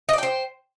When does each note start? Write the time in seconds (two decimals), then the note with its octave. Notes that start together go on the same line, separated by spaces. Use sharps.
0.09 D#5
0.13 D5
0.18 G5
0.23 C5